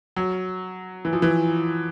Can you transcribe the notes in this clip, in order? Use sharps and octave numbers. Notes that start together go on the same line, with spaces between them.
F#3
E3
F3
E3